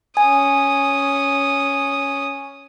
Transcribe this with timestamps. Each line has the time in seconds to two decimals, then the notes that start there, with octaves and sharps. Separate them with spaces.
0.17 C#4 G#5 D#6